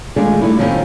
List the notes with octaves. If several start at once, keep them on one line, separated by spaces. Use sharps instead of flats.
D#3 G#3 A3 D4 F4 G#4
G3 A3 A#3 C4 D#4 E4
A2 D#3 F3 G3 C4 C#4